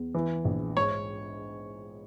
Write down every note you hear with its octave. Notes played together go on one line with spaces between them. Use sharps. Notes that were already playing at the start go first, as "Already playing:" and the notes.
Already playing: E2
E3
A#1
G#2 C#5